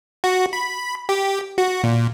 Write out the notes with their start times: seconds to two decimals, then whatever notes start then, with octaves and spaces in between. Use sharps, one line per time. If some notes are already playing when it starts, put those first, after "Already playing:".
0.24 F#4
0.53 B5
1.09 G4
1.58 F#4
1.84 A#2